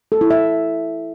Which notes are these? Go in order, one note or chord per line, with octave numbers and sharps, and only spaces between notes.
A4
E4
E5